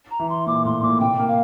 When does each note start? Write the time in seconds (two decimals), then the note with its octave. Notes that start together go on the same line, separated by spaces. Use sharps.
0.11 A#5
0.20 E3
0.29 C6
0.47 A#2 D6
0.65 A2 C6
0.83 A#2 D6
1.00 C3 G5
1.19 A#3
1.28 F5